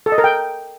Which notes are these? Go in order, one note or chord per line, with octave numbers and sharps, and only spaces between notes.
A4
D#5
A#4
G5